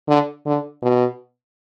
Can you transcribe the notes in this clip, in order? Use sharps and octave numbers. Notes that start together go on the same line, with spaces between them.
D3
D3
B2